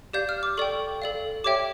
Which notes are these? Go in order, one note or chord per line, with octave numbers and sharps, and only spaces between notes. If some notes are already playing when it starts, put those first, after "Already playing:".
G4 D5 F5 G6
F6
D6
A4 D5 G5 C#6
A4 D5 F5
G4 C#5 E5 G5 D6